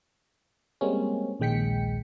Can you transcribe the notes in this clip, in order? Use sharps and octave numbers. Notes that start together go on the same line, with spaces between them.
G3 G#3 A#3 C4 C#4
A#1 D#2 G#3 G5 B6 C#7